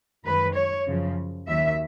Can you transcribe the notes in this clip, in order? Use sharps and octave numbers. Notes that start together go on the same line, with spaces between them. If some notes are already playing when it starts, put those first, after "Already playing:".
F#2 D#3 G#3 B4
C#5
F#2 C#3 F3
D#2 D#3 F#3 E5